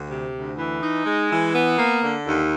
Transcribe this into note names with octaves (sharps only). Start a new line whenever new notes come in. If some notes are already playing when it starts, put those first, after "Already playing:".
Already playing: D2
C3
D2
E3
D#4
G#3
E3
B3
A#3
D3
D#2